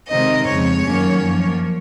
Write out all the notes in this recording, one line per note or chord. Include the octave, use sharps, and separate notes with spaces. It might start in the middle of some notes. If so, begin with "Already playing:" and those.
C3 D#3 G#3 C4 D#4 D#5
F2 C#3 G#3 C#5
F#2 D#3 F#3 A#3 C#4
F#2 F3 A#3